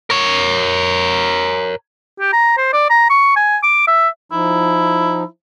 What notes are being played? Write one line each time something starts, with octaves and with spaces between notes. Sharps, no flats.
A#4 C#5
G4
A#5
C5
D5
A#5
C#6
G#5
D6
E5
F3 D#4 E4